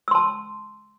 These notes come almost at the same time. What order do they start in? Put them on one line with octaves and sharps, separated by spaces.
E6 C6 A5